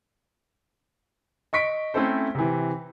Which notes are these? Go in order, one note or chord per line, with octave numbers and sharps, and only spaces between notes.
D#5 C#6 B6 D7
A3 C4 C#4 E4 A4 C5
C3 E3